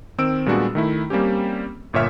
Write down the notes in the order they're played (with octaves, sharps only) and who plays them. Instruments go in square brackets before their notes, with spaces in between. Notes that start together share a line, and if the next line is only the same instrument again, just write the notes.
[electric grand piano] D#3 C4 E6 D7
A#2 G3 G#3 B3 D4 F#4
D#3 A3 E4
G3 A#3 C4 C#4 G4
G1 A#2 C#5 E5 F6